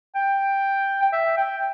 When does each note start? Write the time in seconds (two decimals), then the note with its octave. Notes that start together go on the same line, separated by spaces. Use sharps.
0.15 G5
1.02 G5
1.13 E5
1.37 G5